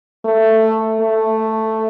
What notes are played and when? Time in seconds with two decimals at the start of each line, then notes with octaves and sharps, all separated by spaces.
0.25 A3
1.01 A3